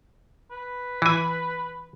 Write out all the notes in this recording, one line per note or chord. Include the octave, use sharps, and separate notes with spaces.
B4
E3 G#5